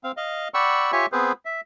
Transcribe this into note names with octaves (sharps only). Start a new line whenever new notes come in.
C4 F5
D#5 F5
D5 F#5 G5 B5 C#6 E6
F4 G4 C#5 E5 G#5 C#6
B3 C4 G#4 B4 C5
E5